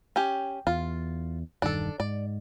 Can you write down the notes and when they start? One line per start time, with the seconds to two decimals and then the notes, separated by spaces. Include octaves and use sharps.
0.16 C#4 G4
0.67 E2 F4
1.62 E1 G2 D#3 D4 A4
2.00 G#2 D5